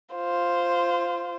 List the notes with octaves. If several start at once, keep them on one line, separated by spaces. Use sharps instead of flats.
F4 C5